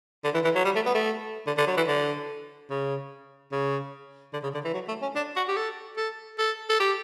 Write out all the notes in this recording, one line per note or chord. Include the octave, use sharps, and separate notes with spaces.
D3
E3
E3
F#3
G3
A3
B3
A3
D3
D3
F#3
E3
D3
C#3
C#3
D3
C#3
D3
E3
F#3
A3
C#4
D4
F#4
G4
A4
A4
A4
A4
G4